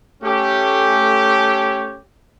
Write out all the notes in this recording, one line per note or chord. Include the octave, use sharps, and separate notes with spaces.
A3 C#4 G4